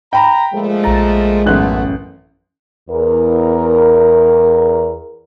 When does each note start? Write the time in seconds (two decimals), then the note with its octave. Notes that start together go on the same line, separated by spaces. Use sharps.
0.13 G5 A#5 B5
0.54 A#2 F3 G#3 A3
0.84 A#1 A#5 A6
1.46 A1 F#2 A3 B3 F#6
2.90 E2 A#4